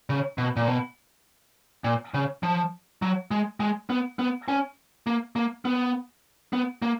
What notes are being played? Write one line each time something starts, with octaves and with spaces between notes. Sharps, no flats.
C#3
B2
A#2
B2
A#2
C#3
F3
F#3
G#3
G#3
B3
B3
C#4
A#3
A#3
B3
B3
A#3